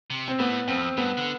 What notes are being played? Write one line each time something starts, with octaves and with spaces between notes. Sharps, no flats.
C3
C4
A2 B3
F2 C4
G2 B3
D3